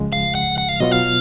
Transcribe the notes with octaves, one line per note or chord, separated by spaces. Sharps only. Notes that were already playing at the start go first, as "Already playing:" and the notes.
Already playing: C#2 C#3 F3 G#3
F5
F#5
F#5
F5
B2 F#3 B3 F4 D#5
F5